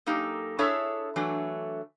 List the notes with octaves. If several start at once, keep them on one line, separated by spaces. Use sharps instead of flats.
F#2 A#3 D#4 G4 A4
D4 E4 G#4 A4 C#5 E5
E3 F#3 A3 D4